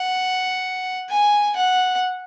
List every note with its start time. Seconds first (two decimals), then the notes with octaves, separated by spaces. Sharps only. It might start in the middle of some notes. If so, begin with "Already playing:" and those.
Already playing: F#5
1.10 G#5
1.56 F#5